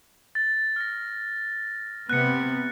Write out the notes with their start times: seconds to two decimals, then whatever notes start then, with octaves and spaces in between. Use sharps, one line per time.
0.35 A6
0.76 F6 A#6
2.09 C3 B3 F#6 C#7